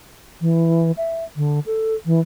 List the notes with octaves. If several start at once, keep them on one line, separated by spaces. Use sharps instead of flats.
E3
E5
D3
A4
E3